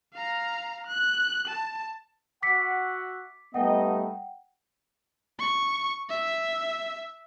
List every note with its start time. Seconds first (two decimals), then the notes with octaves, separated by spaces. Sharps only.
0.14 F5 A#5
0.87 F#6
1.48 A5
2.42 F#4 E5 F#5 D6 B6 C#7
3.54 G3 A3 B3 D#4 D#5 F#5 G5
5.39 C#6
6.09 E5